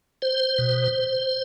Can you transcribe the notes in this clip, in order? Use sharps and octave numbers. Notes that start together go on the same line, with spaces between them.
C5
B2